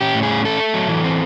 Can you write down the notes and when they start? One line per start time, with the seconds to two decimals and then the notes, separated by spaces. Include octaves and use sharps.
0.01 C#4 G4
0.15 A2
0.23 G#4
0.31 C#4
0.45 A3 A4
0.60 A3
0.74 F#3
0.89 E3
1.04 C4